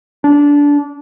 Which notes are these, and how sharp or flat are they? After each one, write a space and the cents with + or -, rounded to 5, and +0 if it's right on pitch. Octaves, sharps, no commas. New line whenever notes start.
D4 -20